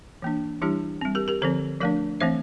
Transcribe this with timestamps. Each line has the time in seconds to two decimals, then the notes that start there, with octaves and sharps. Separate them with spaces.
0.22 E3 A#3 D4
0.62 E3 G3 D4 E4 G4
1.01 G3 C4
1.15 G4 A#4
1.28 G4 A#4
1.42 D3 F3 C4 A4 C5
1.81 F3 A3 D4 A#4 D5
2.20 E3 A3 C4 C5 E5